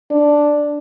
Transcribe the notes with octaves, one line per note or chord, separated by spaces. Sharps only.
D4